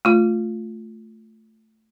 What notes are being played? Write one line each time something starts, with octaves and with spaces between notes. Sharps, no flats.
A3 F4